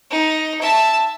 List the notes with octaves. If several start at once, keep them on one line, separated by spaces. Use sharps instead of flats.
D#4
E5 A5